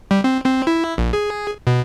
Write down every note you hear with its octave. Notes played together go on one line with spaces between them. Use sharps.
G3
C4
C4
E4
A#1
G#4
B2